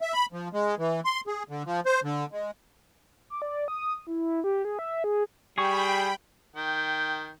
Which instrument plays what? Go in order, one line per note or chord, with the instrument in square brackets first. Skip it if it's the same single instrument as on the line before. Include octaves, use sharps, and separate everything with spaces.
[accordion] E5
B5
F3
G#3
E3
C6
G#4
D3
F3
C5
D3
G#3
[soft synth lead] D6
D5
D#6
E4
G4
G#4
E5
G#4
[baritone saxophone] G3 [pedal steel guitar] G#4 C#6 [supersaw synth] G5 B5
[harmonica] D#3 G5